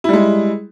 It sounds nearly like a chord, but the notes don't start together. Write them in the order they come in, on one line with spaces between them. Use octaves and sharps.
E4 G3 G#3